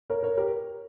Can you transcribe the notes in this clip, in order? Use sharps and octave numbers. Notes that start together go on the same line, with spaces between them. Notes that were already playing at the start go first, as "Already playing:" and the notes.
A#4 C#5
A#4 C#5
G4 A#4